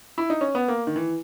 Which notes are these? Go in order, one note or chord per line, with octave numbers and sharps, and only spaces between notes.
E4
D#4
C#4
B3
A#3
D#3
E3